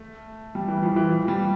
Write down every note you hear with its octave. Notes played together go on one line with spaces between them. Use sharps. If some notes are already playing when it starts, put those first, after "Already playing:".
Already playing: A3
G3
E3
F3
E3
F3
G3